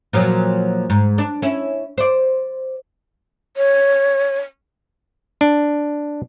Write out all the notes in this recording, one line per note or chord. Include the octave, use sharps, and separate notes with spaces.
A#2 F3 F#3
G#2
D4
C#4 E4
C5 D5
C#5
D4